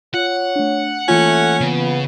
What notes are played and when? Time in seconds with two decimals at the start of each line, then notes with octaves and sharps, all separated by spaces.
0.14 F4 C#5 F#5
0.56 A3 D4
1.08 E3 A3 A#3 C#4 F4
1.61 C#3 B3